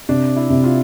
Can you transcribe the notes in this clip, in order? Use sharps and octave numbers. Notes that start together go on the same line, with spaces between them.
C3 D4
E4
C3
F4